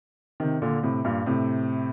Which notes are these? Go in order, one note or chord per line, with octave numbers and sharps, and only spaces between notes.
C3 D#3
A#2 D3
A2 C3
G2 A#2
A2 C3